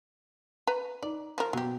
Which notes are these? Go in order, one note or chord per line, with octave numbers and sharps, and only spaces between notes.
B4 A#5
D#4 D5
F3 A#4
B2 F#3 G4